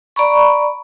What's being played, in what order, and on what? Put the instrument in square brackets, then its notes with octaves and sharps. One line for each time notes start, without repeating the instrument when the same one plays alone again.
[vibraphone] D5 A#5 B5 C#6